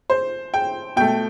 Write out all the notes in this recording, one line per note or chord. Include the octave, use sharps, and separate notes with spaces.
C5
G5
B2 A3 G5